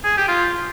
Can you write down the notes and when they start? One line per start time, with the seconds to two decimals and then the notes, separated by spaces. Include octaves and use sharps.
0.04 G#4
0.17 G4
0.28 F4